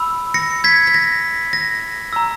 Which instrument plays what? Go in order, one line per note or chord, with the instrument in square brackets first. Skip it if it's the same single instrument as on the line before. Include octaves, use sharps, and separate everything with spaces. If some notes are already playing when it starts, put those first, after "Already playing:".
Already playing: [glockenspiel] B5 E6
A#6 C#7
G#6 B6
B6
A#6
A#6
A#5 E6